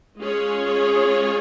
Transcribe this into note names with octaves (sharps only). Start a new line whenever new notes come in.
G#3 C#4 F4 G#4 C#5